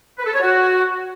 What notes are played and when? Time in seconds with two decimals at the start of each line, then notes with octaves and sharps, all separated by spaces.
0.19 B4
0.26 A4
0.34 C#5
0.42 F#4